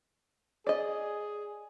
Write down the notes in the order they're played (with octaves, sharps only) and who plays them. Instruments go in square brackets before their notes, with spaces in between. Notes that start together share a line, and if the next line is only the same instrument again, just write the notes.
[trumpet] G#4 [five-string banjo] D5 D#5